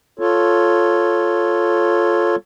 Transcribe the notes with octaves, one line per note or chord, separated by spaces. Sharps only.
F4 A4 C#5